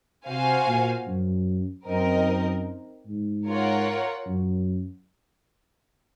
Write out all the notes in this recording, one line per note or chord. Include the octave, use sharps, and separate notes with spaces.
C3 F#4 C5 F5 G#5
A#2
F#2
F#2 C4 D#4 A#4 D#5
G#2
F4 A#4 C#5 F#5
F#2